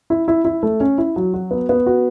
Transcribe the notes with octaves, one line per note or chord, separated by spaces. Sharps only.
E4
E4
E4
A3
C#4
E4
F#3
F#4
B3
B3
F#4